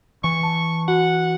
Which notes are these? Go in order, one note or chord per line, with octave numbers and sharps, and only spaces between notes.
E3 C#6
A5
F#4 F#5